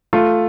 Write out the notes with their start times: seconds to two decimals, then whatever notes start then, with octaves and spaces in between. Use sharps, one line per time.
0.13 A3 F4